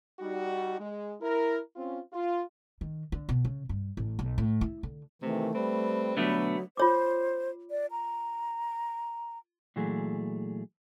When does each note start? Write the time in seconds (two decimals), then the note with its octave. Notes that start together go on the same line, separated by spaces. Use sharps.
0.19 G3 D#4 F#4
0.79 G#3
1.21 E4 A#4
1.76 C4 C#4 F4
2.13 F4
2.81 D#3
3.12 D3
3.29 B2
3.45 C#3
3.69 G2
3.97 A1
4.19 B1
4.38 A2
4.61 E4
4.83 D3
5.22 C3 D#3 E3 A3
5.54 G3 C4 B4
6.17 B2 D3 F#3 A3 B3
6.77 F4 C5 C#5 D6
7.71 D5
7.91 A#5
9.76 A#2 E3 F#3 A3 G#4